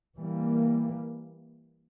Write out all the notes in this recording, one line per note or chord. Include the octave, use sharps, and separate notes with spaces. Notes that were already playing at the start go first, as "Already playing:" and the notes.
E3 G3 A#3